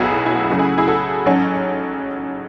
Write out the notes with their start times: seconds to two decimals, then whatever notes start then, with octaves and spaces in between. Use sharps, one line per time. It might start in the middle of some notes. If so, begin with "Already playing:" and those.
Already playing: B1 A2 F#3 B3 E4 F#4 G#4
0.12 E4
0.26 E4
0.31 F#4
0.44 E4
0.49 F#2 C#3 F#3 A3 F#4
0.59 E4 G#4
0.78 E4 G#4
0.88 F#4 A4
1.25 A1 G#2 F#3 C#4